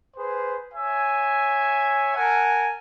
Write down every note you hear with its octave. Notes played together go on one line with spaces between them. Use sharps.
G#4 B4 C5
C#5 E5 G#5
A#4 F#5 G#5 A5